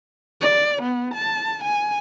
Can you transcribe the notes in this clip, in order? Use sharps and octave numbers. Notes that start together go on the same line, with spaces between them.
D5
B3
A5
G#5